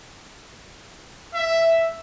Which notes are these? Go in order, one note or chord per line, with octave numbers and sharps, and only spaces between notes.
E5